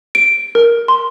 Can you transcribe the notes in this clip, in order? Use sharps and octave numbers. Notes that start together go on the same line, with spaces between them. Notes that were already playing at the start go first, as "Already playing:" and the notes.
D7
A#4
C6